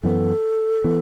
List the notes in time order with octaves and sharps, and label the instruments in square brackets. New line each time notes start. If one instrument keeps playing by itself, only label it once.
[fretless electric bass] F#2 E3 B3 [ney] A4
[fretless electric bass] E3 B3